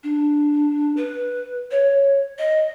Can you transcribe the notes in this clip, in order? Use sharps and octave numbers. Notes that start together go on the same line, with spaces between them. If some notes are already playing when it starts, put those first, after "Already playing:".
D4
B4
C#5
D#5